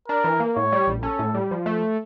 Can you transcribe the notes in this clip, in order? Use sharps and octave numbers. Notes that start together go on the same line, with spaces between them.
D4 A#4
E3
A#3
A2 C#5
G3
A#1
C#4 A4
A2
G3
F3
A3